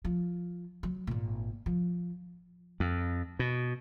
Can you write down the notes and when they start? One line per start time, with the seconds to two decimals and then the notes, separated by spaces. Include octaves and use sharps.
0.05 F3
0.83 F#3
1.07 G#1 A#2
1.66 F3
2.80 F2
3.39 B2